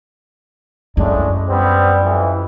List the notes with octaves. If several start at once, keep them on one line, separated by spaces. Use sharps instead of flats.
F#2 A2 G#3 D4
G3 B3 C4
F2 E3